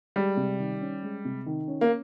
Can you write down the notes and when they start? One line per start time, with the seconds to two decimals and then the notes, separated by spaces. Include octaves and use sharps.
0.16 G3 G#3
0.37 C3
0.59 D#3
0.81 C#4
1.03 G#3
1.25 C3
1.46 D#3
1.68 C#4
1.81 A#3